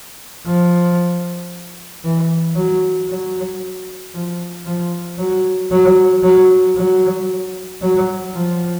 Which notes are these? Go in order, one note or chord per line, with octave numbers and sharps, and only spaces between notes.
F3
E3
F#3
F#3
F3
F3
F#3
F#3
F#3
F#3
F#3
F3